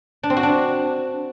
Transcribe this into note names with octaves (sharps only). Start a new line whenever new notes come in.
D4
C4
F#4
D4